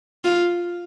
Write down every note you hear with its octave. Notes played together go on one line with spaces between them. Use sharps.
F4